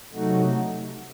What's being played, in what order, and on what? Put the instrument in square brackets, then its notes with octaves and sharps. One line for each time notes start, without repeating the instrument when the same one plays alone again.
[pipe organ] C3 F#3 A3 D#4 F#4